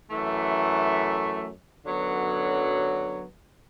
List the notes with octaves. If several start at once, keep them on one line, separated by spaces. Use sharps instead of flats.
F#2 E3 A3
F#2 D3 F#3 B3